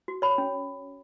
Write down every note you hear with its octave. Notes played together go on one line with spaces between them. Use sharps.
F#4
C#5 B5
C#4